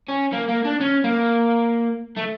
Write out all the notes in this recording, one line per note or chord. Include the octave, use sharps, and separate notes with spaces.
C#4
A#3
A#3
D4
C#4
A#3
A3